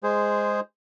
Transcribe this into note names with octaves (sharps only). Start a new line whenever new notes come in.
G#3 G#4 C5